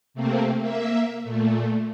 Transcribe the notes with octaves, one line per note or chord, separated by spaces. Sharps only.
C3 A3 A#3 C4
A#3 E5
A#2 A3